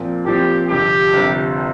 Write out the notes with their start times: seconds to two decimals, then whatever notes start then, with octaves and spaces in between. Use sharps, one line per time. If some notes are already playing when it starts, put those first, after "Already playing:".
Already playing: A#2 F3 C4
0.25 A#2 F3 C4 G4
0.69 G1 F2 C3 G4
1.14 G1 F2 C3